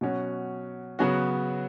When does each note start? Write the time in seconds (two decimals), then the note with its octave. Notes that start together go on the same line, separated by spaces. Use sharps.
0.01 B2 F#3 C#4 F#4
0.99 C#3 F#3 B3 F#4